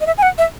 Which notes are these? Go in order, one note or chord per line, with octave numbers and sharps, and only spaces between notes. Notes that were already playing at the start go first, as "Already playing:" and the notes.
D#5
E5
G#5
F#5
E5